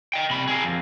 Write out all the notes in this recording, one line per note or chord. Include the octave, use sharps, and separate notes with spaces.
D#5 G5
C3 B5
G#4 A#4
F2